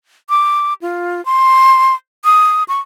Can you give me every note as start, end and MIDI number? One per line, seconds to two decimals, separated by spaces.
0.29 0.73 86
0.81 1.24 65
1.25 1.94 84
2.25 2.63 87
2.68 2.80 85